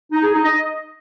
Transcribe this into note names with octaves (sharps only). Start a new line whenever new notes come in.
D#4
G#4
D#4
D#5